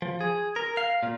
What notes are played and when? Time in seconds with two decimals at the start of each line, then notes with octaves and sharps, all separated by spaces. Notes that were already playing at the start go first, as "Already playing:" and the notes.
0.02 F3
0.21 G#4
0.56 A#4
0.77 F5
1.03 A#2